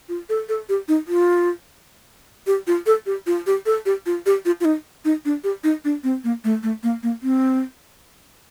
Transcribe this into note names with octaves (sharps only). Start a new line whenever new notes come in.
F4
A4
A4
G4
D#4
F4
G4
F4
A4
G4
F4
G4
A4
G4
F4
G4
F4
F4
D#4
D#4
D4
G4
D#4
D4
C4
A#3
A3
A3
A#3
A#3
C4